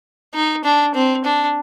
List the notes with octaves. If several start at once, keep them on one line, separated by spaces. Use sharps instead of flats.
D#4
D4
C4
D4